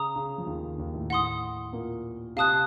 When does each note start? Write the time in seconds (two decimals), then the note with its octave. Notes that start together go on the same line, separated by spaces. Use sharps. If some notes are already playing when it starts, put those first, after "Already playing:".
Already playing: C#3 A#5 D#6
0.16 C#3
0.38 F3
0.46 D#2 D#3
0.78 D#2 D#3
0.94 A2 A3
1.10 A2 A3 F#5 C6 D#6
1.73 A#2 A#3
2.36 C3 C4 F5 A5 D#6 F#6